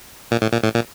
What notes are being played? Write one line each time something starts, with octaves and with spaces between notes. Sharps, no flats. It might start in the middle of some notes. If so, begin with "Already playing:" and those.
A#2
A2
A#2
A2
A#2